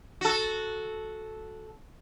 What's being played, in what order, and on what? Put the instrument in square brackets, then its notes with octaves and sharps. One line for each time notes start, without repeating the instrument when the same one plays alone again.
[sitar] F#4 A4